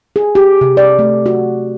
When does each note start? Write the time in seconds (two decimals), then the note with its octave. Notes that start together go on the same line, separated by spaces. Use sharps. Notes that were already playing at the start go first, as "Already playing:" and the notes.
0.16 G#4
0.35 G4
0.61 C3
0.77 D5
0.99 A3
1.26 F#4